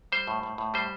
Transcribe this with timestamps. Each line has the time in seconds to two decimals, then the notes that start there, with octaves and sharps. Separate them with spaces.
0.12 G3 C5
0.28 A2
0.43 A2
0.58 A2
0.74 G3 C5